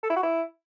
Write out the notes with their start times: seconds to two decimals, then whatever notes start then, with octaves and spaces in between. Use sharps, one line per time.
0.03 A4
0.10 E4
0.16 F#4
0.23 E4